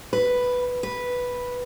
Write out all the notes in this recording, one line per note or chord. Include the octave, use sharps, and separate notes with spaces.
B4
B4